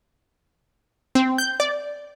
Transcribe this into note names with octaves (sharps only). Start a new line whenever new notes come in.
C4
G6
D5